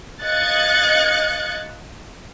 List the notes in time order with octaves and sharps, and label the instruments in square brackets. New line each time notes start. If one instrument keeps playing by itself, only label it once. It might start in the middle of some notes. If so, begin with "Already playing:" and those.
[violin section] D#5 F5 F#6 G#6 A6 C#7